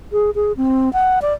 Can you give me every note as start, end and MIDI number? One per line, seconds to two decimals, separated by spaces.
0.12 0.30 68
0.35 0.52 68
0.57 0.92 60
0.93 1.19 78
1.22 1.33 74